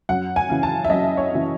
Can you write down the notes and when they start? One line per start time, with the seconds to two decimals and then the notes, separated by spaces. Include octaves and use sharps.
0.09 F#2 F#5
0.36 G#5
0.50 C#3 E3
0.63 A5
0.85 E5
0.90 F#2 D#5
1.17 C#5
1.31 C#3 E3